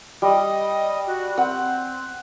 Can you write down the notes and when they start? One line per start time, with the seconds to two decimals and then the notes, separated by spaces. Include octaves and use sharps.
0.22 G3 D#5
1.07 F#4
1.38 C4 F#5